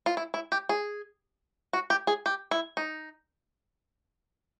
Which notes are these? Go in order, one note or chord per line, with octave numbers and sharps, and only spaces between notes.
F4
E4
E4
G4
G#4
F#4
G4
G#4
G4
E4
D#4